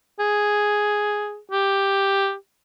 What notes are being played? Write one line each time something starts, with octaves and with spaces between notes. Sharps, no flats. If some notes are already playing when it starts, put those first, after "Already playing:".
G#4
G4